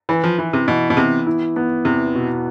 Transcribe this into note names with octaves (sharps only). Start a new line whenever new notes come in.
E3 B4
F3
E3 E4
C3
B2 E3
B2
C3 B3
E4
B3
E2 C3
B2